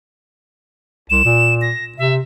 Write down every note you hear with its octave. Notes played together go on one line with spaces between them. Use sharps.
C2 E7
A#2
A#6
C3 E5